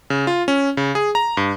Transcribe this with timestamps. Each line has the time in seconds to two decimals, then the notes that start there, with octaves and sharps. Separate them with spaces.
0.10 C#3
0.27 F4
0.48 C#4
0.77 C#3
0.95 G#4
1.15 A#5
1.37 G2